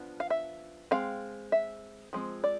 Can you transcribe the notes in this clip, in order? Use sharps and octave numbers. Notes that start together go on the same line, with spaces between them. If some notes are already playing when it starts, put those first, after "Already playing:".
Already playing: F3 B3 D4
F5
E5
G#3 C4 F5
E5
F3 G#3 C4
D5